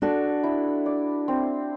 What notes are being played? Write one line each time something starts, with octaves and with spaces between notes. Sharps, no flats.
D4 F#4 A4
E4
D5
C4